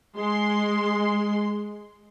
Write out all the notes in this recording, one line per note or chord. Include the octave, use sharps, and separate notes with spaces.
G#3 C6